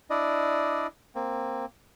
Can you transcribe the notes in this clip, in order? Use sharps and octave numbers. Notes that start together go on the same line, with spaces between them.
D4 E4 D5 D#5
A#3 C4